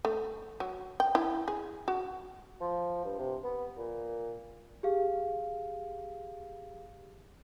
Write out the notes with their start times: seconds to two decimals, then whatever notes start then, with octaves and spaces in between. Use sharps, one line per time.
0.05 A3
0.60 F#3
1.00 G5
1.15 E4
1.48 G#4
1.88 F#4
2.61 F3
3.04 G2
3.18 C3
3.44 B3
3.77 A#2
4.83 G4 G#4 F5